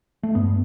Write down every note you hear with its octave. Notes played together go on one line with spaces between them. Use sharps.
A3
G2 B3